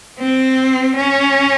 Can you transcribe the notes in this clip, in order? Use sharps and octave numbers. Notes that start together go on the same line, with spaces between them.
C4
C#4